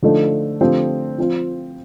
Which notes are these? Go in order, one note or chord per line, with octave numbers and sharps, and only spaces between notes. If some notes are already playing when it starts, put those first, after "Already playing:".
D3 F3 A3 D#4 A4
D3 F3 A3 C4 G4
F3 C4 F4